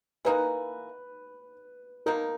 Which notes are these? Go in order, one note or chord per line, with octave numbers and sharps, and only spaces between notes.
E3 A#3 D#4 F#4 B4
B2 A#3 D#4 A#4